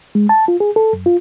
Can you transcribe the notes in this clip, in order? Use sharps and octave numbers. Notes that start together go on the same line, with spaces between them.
G#3
A5
F4
G#4
A4
F#2
F4